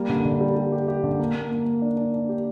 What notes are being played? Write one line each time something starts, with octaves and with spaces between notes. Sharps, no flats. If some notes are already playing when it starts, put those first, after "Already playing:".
Already playing: G3 A#3
D3
D3
G3
G3
G4
G4
D3
A#3
A#3
A#3
A#3
D4
D4
D4
G4